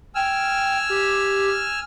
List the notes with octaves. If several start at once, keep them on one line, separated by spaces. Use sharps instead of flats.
G5 G#5 E6 F6
G4